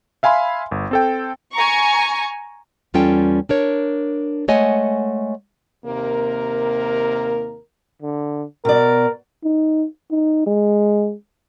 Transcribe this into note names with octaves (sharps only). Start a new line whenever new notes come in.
E5 F5 G#5 B5 C6
G1
C4 A4 G5
G#5 A#5 C#6
E2 G3 C#4 F4 A4 G5
D4 A#4 C#5
G#3 A3 C#5 D#5 F#5 G#5
D#2 C3 A#3 A#4
D3
B2 A#4 D5
D#4
D#4
G#3